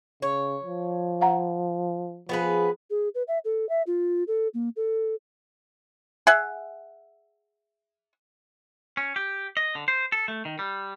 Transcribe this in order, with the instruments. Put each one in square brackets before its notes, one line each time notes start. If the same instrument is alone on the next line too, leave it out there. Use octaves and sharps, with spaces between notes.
[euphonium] C#3 [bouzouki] C#5
[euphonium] F3
[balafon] F5 F#5 A#5
[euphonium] F3 [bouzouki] B3 G#4 B4
[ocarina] G#4
B4
E5
A4
E5
F4
A4
A#3
A4
[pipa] G#4 E5 F#5
[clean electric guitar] C#4
G4
D#5
D3
C5
A4
A3
D#3
G3